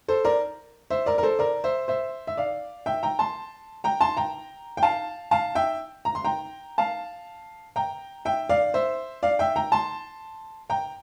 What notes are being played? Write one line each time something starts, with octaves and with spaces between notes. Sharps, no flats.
A4 C5
A#4 D5
C5 E5
A#4 D5
A#4
A4 C5
A#4 D5
C5 E5
C5 E5
E5
D5 F5
E5 G5
G5 A#5
A5 C6
G5 A#5
A5 C6
G5 A#5
G5
F5 A5
F5 A5
E5 G5
A#5
C6
G5 A#5
F5 A5
G5 A#5
E5 G5
D5 F5
C5 E5
D5 F5
E5 G5
G5 A#5
A5 C6
G5 A#5